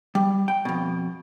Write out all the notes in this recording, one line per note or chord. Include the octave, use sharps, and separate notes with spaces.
G3
G5
F2 B2